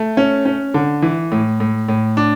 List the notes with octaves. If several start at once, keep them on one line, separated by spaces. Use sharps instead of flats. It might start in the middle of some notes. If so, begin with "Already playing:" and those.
Already playing: A3
C#4
C#4
D3
E3
A2
A2
A2
D4